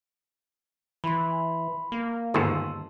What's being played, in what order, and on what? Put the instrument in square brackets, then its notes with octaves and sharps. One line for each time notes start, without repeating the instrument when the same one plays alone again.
[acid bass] E3 [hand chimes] B5 C6
[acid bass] A#3
[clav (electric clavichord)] G1 D#2 G#2 [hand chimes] A5 C6 E6